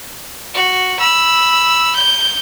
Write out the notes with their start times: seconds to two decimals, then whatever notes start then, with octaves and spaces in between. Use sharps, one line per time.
0.55 F#4
1.00 B5 E6
1.96 G6